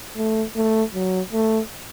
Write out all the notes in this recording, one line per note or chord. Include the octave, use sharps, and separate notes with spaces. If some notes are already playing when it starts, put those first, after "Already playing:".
A3
A3
F#3
A3